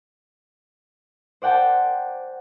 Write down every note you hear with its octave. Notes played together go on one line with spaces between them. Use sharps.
C5 D5 F#5 G5 A5 D6